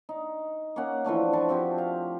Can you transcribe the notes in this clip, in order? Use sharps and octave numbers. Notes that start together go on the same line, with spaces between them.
D#4
A#3 C#4 F#5
E3 F3 A3 D4
F3 B4 A5 C#6
F3 C4 F#4 G4
F5